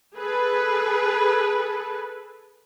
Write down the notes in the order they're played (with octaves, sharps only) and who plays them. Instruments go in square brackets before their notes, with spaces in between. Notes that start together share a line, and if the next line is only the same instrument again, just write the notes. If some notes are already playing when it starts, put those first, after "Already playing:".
[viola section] G#4 A4 B4